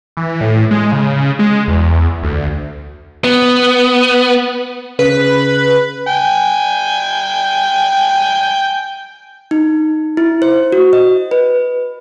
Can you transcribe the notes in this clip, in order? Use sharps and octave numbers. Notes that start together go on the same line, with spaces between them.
E3
A2
G#3
C#3
G#3
E2
D2
B3
C#3 B4
G5 G#5
D#4
E4
C5
F#4
D#5
B4